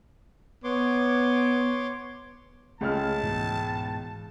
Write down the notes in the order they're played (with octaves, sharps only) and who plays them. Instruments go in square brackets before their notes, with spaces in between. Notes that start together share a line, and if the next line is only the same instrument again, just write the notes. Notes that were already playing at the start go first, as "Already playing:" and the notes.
[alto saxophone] B3 [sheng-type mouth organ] C#5 C6 D6
[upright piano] C#2 G#3 F6 [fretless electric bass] A3 [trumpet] A5
[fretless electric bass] G#2 B2 E3